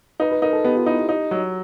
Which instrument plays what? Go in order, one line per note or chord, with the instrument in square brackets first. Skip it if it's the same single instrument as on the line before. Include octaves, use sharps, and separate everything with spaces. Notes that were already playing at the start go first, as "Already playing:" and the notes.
[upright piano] D#4 [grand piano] B4
[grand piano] B4
[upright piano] D#4 [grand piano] A#4
[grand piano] A4
[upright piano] B3 [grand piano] G4
[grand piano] F4
[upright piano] D#4 [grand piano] E4
[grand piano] G4
[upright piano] D#4 [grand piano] G4
[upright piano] F#3